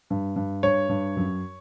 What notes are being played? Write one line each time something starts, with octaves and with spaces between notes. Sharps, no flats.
G2
G2
G2 C#5
G2
F#2